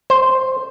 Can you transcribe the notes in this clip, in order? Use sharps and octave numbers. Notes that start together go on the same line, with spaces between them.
C5